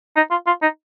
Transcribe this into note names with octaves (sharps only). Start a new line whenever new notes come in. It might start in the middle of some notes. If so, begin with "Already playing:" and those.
D#4
F4
F4
D#4